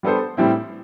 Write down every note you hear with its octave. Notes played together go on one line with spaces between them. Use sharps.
G3 B3 D4 A4 C5
A2 G3 C4 E4